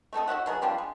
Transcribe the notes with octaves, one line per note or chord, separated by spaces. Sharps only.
A3 C4 A4 D#5
F#4 C#5 E5 F#5
B2 F#3 G#4
F3 G3 C4 D4
G#3